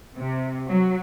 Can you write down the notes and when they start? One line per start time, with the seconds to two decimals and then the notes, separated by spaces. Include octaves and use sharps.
0.16 C3
0.69 F#3